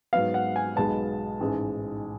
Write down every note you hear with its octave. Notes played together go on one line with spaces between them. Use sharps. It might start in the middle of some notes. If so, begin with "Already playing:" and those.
G#2 F#3 B3 F5
F#5
G#5
B1 B2 G#3 B3 A5
A1 G#2 G#3